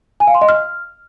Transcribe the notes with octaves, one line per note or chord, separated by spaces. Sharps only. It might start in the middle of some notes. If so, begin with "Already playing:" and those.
G#5
F5
C6
D#5
F6